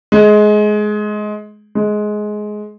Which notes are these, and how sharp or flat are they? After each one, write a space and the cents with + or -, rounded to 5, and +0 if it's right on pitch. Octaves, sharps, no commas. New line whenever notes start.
G#3 +20
G#3 +15